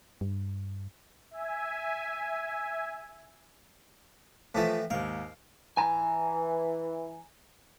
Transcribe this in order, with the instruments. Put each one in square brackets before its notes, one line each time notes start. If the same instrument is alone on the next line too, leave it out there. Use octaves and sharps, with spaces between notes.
[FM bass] G2
[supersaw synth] E5 G#5
[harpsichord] A2 E3 A3 [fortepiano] F3 A5
[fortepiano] D#2 G#2 [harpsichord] F5
[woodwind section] E3 [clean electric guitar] G#5 A#5